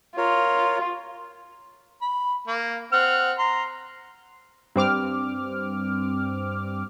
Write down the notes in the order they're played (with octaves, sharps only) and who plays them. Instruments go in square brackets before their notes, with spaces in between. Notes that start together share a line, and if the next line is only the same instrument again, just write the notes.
[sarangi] F4 [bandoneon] A#4 C#5
[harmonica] B5
A#3
C4 F#5 F6
A#5 C6
[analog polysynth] G2 C4 D6 F6